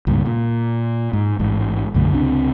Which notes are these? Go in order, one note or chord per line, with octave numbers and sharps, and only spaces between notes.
C#2 G2 A#2
A#2
G#2
A1 G#2
B1 F#2 D3 A3
C#2 C3 C4 D4